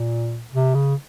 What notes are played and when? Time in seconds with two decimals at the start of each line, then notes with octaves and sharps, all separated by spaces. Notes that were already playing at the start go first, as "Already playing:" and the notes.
Already playing: A#2
0.53 C3
0.75 C#3